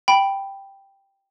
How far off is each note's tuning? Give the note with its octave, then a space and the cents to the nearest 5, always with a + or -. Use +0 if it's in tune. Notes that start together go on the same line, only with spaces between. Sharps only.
G5 +0 B5 +0